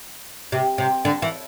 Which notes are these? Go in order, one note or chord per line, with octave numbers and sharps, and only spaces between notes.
C3
C3
D3
E3